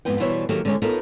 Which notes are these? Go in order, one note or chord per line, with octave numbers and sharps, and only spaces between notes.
F2 G#2 B3 B4 G5
B2 E3 G3 C5 C#5 E5
D#3 F#3 A#3 G4 A4
D3 G#3 C#4 C#5
B3 D#4 F4 A4 A#4 C#5